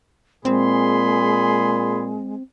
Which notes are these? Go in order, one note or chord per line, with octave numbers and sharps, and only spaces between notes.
A#2 G#3 C4 G#4 B5 C6